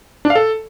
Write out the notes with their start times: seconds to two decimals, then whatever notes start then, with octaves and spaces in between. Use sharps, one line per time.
0.25 D4
0.30 F5
0.35 A4